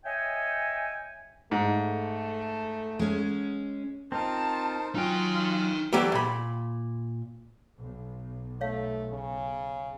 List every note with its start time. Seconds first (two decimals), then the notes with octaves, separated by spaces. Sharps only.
0.05 C#5 D#5 E5 G5 G#5
1.51 G#2 A3
2.99 G#3 C#4
4.12 C4 D#4 F4 A#4 C5 A5
4.95 F#3 C#4 D#4 F4 G5 F6 F#6
5.93 E3 F#3 G3 A3 G4
6.12 A#2 B5
7.77 B1
8.61 A3 C#5 F5
9.11 C#3